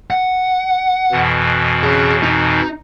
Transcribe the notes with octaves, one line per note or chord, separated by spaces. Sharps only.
F#5
F2 B2 E3
G#4 C#5
D#4